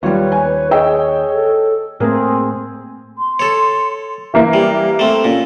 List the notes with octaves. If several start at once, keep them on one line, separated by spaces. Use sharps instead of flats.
D#2 G3 F4 B4 C#5
G#5
G#4 D#5 G5 E6
A4
A2 A3 A#3 C4 G#4 A#4
C6
A4 C#5
E3 A#3 E4 E5
G3 G4
A3 C4
A#2 C#4